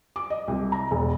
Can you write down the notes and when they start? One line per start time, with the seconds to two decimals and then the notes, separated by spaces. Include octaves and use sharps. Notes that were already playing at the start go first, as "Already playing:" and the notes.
0.16 D6
0.30 D#5
0.48 C2
0.72 A#5
0.91 E1